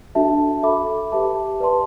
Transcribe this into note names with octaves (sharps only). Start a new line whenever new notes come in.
D4 F#4 A4 E5 A5
A4 E5 B5 D6
G4 B4 E5 A5 D6
B4 D5 A5 C6